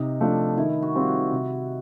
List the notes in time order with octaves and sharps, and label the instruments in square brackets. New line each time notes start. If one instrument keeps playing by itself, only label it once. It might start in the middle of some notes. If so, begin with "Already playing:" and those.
Already playing: [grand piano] C3 [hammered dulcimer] D#4
[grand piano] F3 A3 D4 F4
[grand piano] D#3 [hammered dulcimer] E4
[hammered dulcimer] F#4
[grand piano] G3 C4 F4
[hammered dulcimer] F#4
[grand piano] C3